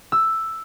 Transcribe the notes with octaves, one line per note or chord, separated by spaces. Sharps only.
E6